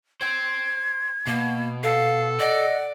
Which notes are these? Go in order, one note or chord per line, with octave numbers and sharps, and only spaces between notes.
C5 G5 G#6
B2 A#3
A4 F5
D5 D#5 F#5